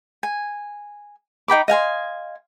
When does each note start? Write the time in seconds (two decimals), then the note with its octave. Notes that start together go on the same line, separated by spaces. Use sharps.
0.23 G#5
1.48 D#4 G5 B5 D6
1.68 D#5 F5 G#5 C6